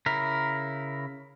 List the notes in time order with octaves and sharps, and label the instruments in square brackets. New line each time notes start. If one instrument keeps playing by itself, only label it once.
[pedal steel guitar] C#3 E4 A#4